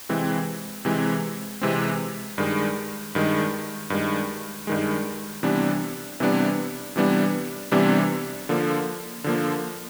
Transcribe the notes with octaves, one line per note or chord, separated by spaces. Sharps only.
C3 E3 G#3 C4
C3 E3 G#3 C4
C3 E3 G#3 C4
G2 D#3 G#3
G2 D#3 G#3
G2 D#3 G#3
G2 D#3 G#3
C3 E3 G3 B3 D4
C3 E3 G3 B3 D4
C3 E3 G3 B3 D4
C3 E3 G3 B3 D4
D3 F3 A#3
D3 F3 A#3